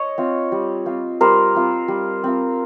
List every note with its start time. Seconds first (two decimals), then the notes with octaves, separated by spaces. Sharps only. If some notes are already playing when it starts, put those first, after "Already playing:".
Already playing: C#5 D#5
0.18 C4 F4
0.52 G3
0.86 C4 F4
1.21 G3 A#4 C5
1.55 C4 F4
1.88 G3
2.24 C4 F4